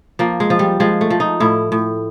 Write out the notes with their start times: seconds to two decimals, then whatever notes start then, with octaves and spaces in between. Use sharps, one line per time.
0.19 F3 A#3
0.40 G#3
0.50 F3
0.59 G3
0.80 F3 G#3
1.01 A3
1.10 F3
1.20 D#4
1.40 A2 E4
1.72 A2